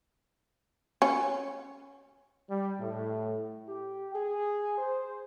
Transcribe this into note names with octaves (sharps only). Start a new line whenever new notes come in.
C#4
G3
A2
G4
G#4
C5